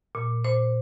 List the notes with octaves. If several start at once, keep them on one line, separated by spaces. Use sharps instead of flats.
A#2
A#2 C5